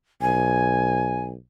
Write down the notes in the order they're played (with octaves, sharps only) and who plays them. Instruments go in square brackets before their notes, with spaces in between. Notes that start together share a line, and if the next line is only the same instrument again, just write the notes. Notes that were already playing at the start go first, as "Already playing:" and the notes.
[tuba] B1 [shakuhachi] G#5